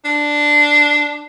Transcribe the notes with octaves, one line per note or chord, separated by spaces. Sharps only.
D4